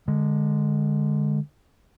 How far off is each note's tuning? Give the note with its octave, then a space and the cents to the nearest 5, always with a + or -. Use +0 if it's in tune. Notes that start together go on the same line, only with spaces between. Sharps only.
D3 +20 G#3 +0